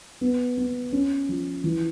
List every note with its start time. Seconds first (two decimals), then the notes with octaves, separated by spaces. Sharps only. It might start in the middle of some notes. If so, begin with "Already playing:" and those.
0.21 B3
0.57 B3
0.92 C#4
1.29 F3
1.64 E3